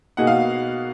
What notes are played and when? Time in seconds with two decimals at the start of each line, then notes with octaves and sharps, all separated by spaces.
0.17 B2 A#3 D#4 G#4 F#5
0.27 F5